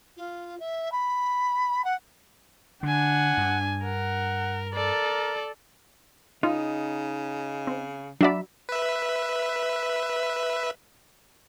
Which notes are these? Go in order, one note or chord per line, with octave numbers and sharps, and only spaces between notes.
F4
E5
B5
F#5
D3 D4 F#5 G#5
G2
A#4 F#5
A4 A#4 D5
C#3 D#4 F4
C4
F#3 D4 F#4 D5 E5 B5
B4 E5